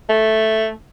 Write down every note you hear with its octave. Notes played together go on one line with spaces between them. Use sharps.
A3